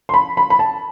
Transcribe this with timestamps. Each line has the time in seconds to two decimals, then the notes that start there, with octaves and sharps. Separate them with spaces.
0.09 C6
0.14 B5
0.37 B5
0.50 B5
0.59 A5